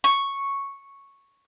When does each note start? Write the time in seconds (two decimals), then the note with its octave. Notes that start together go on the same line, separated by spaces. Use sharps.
0.04 C#6